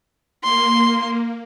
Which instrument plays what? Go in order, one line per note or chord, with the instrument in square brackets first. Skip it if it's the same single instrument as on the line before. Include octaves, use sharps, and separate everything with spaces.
[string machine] A#3 [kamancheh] C6